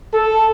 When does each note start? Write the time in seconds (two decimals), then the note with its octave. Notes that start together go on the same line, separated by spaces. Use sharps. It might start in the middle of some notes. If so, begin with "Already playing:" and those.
0.14 A4